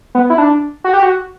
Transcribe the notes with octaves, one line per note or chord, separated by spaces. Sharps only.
B3
E4
D4
F#4
G4
F#4